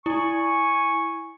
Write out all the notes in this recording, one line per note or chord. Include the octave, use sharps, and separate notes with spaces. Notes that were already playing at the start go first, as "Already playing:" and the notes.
E4 G#5 C#6